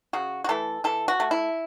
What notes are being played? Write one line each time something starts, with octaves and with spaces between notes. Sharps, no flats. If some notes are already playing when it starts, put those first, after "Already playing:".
C#3 F#4
F#4
E3 A3 A4
E3 A4
F#4
A3
E4